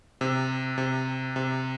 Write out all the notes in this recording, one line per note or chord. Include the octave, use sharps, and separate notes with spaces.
C3
C3
C3